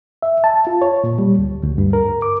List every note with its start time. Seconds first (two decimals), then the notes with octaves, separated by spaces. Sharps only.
0.23 E5
0.44 A5
0.67 F4
0.82 C#5
1.04 A#2
1.18 G3
1.39 D2
1.63 D2
1.78 G2
1.93 A#4
2.22 D6